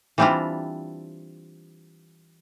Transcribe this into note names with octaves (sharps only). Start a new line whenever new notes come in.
E3 G3 C4 D4 E4 F4